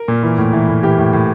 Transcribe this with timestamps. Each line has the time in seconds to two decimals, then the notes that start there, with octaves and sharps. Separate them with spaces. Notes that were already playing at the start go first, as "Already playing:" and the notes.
Already playing: A#4
0.08 A#2
0.23 E3
0.38 A2
0.53 E3
0.68 A2
0.83 E3 G4
0.98 A2
1.13 A2